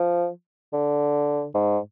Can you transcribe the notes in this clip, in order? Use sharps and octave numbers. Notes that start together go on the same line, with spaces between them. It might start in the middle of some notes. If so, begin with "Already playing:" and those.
Already playing: F3
D3
G#2